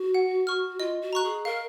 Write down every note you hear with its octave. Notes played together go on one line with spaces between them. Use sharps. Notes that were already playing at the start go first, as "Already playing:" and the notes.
Already playing: F#4
F#5
C#6 F6
F4 D#5
F#4
A#5 C#6 F#6
G#4
A#4 F5